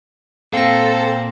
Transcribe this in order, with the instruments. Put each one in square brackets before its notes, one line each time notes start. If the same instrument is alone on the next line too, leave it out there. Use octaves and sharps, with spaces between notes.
[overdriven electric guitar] A#2 [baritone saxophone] C4 [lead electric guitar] A4 [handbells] F5 A#6